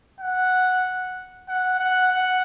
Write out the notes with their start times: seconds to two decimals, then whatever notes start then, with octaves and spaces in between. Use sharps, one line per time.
0.20 F#5
1.48 F#5
1.79 F#5
2.12 F#5